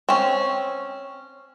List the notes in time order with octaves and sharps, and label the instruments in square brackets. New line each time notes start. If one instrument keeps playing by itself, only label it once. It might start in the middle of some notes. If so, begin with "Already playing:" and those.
[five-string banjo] C4 C#4